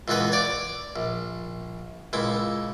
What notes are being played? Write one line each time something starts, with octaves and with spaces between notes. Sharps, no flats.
C#2 A#2 E3 B3 B4
C#5 D5 D6
A#1
C#2 A#2 E4